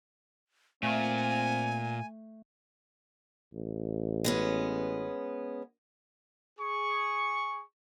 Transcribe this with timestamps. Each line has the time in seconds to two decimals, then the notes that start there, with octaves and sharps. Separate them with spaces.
0.83 A#2 A3 C4 G#5
3.53 A1
4.24 G#3 B3 C#4
6.59 G#4 C#6